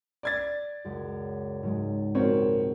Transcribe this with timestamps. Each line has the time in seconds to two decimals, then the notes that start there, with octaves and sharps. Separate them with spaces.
0.23 D5 G#6 A6
0.85 C#2 F#2
1.63 G#2 F#3 G#3
2.15 A#1 C4 F#4 A#4 C#5